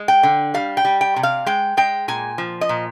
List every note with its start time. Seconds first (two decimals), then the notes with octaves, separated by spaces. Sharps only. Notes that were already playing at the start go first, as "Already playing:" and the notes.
Already playing: G#3
0.08 G5
0.23 D3
0.54 G3 F5
0.77 G5
0.85 G3
1.01 G5
1.16 C3
1.23 F5
1.46 G#3 G5
1.77 G#3 G5
2.08 A#2 G#5
2.38 F3
2.61 D#5
2.69 A#2